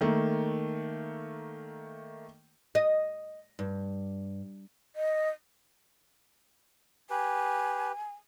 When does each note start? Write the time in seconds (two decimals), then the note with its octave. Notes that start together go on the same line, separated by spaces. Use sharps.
0.01 D#3 A3 A#3
2.75 D#5
3.59 G2
4.96 D#5
7.10 G4 B4 G#5